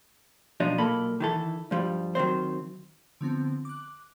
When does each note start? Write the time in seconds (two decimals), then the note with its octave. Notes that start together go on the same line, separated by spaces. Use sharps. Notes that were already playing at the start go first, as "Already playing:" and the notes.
0.60 B1 B2 F3 D4 D#4
0.78 B1 A#2 A#3 A4 B5
1.20 D#3 E3 A4
1.71 G2 F3 G3
2.15 D#3 F#3 C4 C5
3.21 D3 F3 B3 C4
3.65 D6 F#6